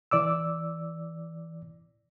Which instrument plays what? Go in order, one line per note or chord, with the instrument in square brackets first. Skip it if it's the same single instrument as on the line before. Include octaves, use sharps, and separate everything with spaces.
[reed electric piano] E3 D5 D6 E6